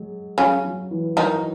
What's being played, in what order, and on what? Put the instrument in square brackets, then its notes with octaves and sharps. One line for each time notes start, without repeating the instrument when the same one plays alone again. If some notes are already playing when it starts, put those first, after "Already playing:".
Already playing: [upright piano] F#3 G#3
[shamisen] C#3 C#4 [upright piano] F#3
[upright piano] F#3
E3
[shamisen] D#3 D#4 [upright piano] F#3